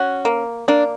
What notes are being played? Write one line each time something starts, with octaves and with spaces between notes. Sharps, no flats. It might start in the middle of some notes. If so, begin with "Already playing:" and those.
Already playing: C#4 F#4
A#3
A#3 D4